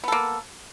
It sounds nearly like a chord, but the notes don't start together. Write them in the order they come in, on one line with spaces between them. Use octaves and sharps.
B3 A4 A#3